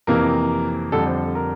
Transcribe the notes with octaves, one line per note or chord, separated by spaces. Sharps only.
F2 C3 E3 A#3 A#4
F2 D3 G3 A4
C5
A#4